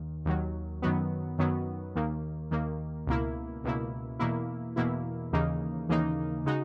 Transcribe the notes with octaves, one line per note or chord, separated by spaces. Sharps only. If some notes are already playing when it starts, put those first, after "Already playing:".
Already playing: D#2 D#3
D#2 D#3 F#3
F#2 D#3 F#3 B3
F#2 D#3 F#3 B3
D#2 D#3 A#3
D#2 D#3 A#3
C#2 B2 A#3 E4
C#2 B2 A#3 E4
E2 B2 A#3 E4
E2 B2 A#3 E4
D#2 C#3 E3 A#3 D#4
D#2 C#3 E3 A#3 D#4
C#3 G#3 D#4 F#4